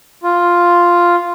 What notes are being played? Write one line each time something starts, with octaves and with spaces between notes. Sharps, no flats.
F4